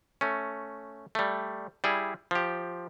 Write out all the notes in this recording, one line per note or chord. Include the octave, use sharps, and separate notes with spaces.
A3 C#4
G3 A3
G3 E4 G#4
F3 G4